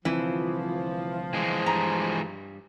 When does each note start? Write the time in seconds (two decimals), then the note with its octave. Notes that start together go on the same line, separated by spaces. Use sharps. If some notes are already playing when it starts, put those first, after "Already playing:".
0.05 C2 D3 E3 F3 C4
1.33 E3 G#3
1.66 G2 A#5